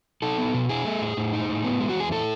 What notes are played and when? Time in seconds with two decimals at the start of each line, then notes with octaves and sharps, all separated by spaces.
0.22 D#4 A4
0.38 B3
0.54 B2
0.69 E4 G#4
0.85 A3
1.01 A2
1.17 A2
1.33 D#4
1.49 A2
1.65 B3
1.80 G#3
1.89 F#4
1.96 E2 G#4
2.11 E4 A4